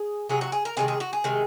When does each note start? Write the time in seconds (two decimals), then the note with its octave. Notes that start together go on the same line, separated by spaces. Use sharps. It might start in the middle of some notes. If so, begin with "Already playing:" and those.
Already playing: G#4
0.29 C3 F#3 G#4
0.41 F#4
0.52 G#4
0.65 A#4
0.77 C3 D#3 G#3 G#4
0.88 G#4
1.00 F#4
1.13 G#4
1.24 C3 D#3 G#3